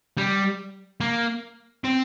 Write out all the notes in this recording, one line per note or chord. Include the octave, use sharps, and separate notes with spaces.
G3
A#3
C4